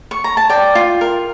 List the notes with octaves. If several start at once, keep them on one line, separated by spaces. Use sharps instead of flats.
C#6
A#5
A5
D5 G5
F4
A#4